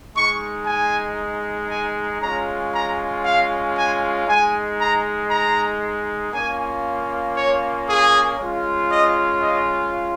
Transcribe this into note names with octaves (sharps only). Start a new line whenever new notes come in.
G#3 D#4 C#6
G#5
G#5
G#3 C#4 F4 A#5
A#5
F5
G#5
G#3 D#4 G#5
A#5
A#5
A#3 C#4 F4 G#5
C#5
G#4
G#3 C#4 F4
D#5
D#5